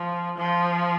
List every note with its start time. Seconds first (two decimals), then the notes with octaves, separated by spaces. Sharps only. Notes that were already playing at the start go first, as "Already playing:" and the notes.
Already playing: F3
0.38 F3